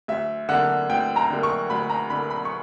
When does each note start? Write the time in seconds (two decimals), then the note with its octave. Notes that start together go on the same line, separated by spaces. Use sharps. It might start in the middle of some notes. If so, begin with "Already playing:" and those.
0.08 D2 E5
0.49 D3 A#3 F#5
0.90 D2 G5
1.16 A#5
1.30 D3 A#3
1.43 C#6
1.70 D2 B5
1.90 A#5
2.10 D3 A#3 B5
2.30 B5
2.45 C#6